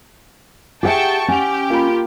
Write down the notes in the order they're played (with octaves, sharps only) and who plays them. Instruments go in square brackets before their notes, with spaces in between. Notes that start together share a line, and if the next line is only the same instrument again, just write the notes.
[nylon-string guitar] G4 F#5 [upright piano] G#4 E5 [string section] G5 A5 C#6
[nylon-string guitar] C#4 [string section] G4 [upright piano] F#5 F7
[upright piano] A#3 B5 [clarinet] F4